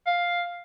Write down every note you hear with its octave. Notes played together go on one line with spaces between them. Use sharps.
F5